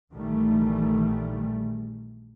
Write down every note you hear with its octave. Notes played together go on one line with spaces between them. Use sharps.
A#1 D#3 E3 G3 A3